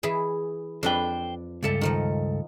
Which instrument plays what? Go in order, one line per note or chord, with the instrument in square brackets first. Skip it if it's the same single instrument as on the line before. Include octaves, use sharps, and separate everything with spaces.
[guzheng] E3 E4 G#4
[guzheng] F2 D4 B4 [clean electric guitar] C5 G5
[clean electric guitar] C#2 G2 A4 [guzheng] D5 E5 A5
[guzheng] D#3 F3 D#4